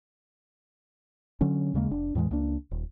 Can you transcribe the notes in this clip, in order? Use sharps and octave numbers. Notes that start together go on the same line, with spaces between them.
D3 F#3 C#4
D#2 C#3 G#3 A#3
F1 D4
E2 A2 E3 G#3
C#2 A#3 D4
D#1